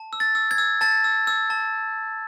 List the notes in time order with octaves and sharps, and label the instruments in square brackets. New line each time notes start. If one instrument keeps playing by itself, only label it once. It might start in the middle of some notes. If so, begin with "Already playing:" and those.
Already playing: [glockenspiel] A5
E6
A6
E6
G#6
E6
A5 A6
E6
E6
A5